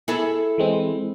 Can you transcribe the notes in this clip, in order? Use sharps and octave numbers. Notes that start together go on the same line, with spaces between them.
E4 G#4 A4
E3 G#3 C4